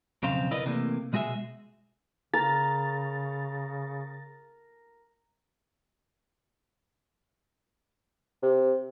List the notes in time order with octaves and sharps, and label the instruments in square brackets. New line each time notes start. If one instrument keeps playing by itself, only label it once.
[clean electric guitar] B1 F2 C#3 C4 C5 F5
E4 A#4 B4 D5 D#5
C3 E3 A3 A#3
B2 G#3 F#4 G#4 E5
[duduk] C#3 [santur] A#4 [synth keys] A6
[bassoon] C3